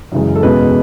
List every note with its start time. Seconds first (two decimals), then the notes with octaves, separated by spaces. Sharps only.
0.12 F#2 C#3 E3 G#3
0.35 A4
0.43 E2 B2 G#3 C#4 B4